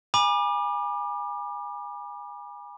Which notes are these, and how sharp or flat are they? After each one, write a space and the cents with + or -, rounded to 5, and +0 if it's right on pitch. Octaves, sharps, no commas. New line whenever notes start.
G#5 -20 B5 -35 D6 +30